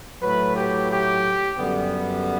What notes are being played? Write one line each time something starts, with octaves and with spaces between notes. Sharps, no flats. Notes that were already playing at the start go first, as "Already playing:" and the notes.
A2 F#3 A3 B4
G4
G4
F#2 D3 G3 B3